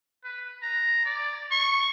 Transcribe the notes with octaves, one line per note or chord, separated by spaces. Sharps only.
B4
A#5
D5
C#6